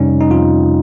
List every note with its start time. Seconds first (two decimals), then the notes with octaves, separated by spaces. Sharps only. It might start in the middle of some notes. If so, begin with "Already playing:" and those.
Already playing: F2 C3 G3 C#4 D#4
0.21 D#4
0.30 F2 F4